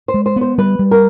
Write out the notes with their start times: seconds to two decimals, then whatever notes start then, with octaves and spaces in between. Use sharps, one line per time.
0.08 C5
0.14 G#3
0.26 C5
0.36 B3
0.41 C5
0.58 G3 B4
0.79 G3
0.91 A#4